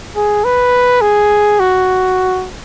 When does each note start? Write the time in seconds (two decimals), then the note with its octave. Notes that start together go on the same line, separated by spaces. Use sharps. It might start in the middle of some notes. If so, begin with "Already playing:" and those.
0.16 G#4
0.44 B4
1.01 G#4
1.60 F#4